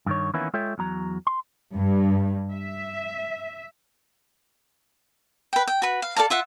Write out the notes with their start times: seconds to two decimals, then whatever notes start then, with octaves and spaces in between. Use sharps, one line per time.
0.06 G2 D#3 C#5
0.34 D#3 E3 A#3 B3 C#4 E4
0.54 G#3 F4 A4 C#5 E5 G5
0.78 E2 F#3 A#5
1.27 C6
1.75 G2
2.52 E5
5.53 B4 G5
5.67 G5
5.82 F#4 B4
6.02 F5
6.16 A4 D5 F5 A5
6.30 F4 E5 F#5